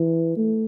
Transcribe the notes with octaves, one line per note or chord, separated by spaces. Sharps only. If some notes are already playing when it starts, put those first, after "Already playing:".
Already playing: E3
A3